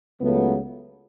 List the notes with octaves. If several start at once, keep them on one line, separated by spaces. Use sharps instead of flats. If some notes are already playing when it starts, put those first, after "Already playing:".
C#2 C#3 F#3 A3 B3